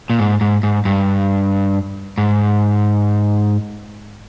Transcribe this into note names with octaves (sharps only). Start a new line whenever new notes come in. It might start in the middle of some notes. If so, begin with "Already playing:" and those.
A#2
G#2
G#2
G#2
G2
G#2